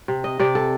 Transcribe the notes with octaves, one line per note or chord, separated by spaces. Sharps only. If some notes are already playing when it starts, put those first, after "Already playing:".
C3
D#5
C3 D5
A4